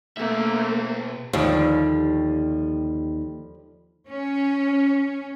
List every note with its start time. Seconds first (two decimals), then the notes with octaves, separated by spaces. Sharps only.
0.17 B2 A3 A#3 E5
1.33 D#2 D3 F3 G3
4.07 C#4